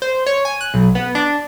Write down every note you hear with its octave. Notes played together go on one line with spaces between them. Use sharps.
C5
C#5
G#5
F#6
B1
B3
D4